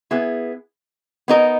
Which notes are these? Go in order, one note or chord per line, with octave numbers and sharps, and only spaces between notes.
B3 E4 G#4
B3 D#4 A#4 D#5